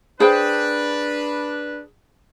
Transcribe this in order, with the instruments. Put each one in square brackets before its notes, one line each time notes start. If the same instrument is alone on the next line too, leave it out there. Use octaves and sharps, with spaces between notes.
[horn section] D4 B4 [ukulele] G#4 C5 G5